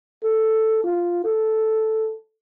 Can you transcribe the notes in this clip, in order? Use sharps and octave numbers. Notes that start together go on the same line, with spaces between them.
A4
F4
A4